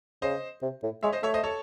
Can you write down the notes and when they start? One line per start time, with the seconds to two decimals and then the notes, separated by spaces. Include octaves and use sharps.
0.22 C#3 C5 D#5
0.62 C3
0.83 A2
1.03 G#3 C#5 E5
1.13 C5 D#5
1.23 A3 C#5 E5
1.34 C5 D#5
1.44 A4 C#5